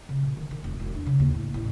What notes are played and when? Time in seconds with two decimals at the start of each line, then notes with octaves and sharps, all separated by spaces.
0.09 C#3
0.23 A#2
0.37 D#3
0.51 D#3
0.64 E1
0.80 E1
0.95 D4
1.06 C#3
1.20 D#2
1.34 A2
1.54 A1